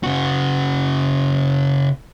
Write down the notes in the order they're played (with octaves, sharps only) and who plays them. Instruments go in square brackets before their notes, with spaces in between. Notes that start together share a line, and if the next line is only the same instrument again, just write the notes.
[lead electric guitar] C#3 F#4